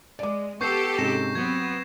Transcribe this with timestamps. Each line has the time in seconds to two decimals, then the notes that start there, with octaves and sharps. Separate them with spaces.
0.19 G#3 D5 D6
0.61 B3 G4 A4 C#6 G6 C7
0.98 G#2 C3 C#4 A#6 E7
1.35 F#3 B3 C4 G#6